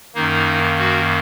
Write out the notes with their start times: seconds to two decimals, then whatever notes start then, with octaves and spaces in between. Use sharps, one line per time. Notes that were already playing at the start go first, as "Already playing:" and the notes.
0.15 F#2 D#3 A#3 D#4
0.79 F#4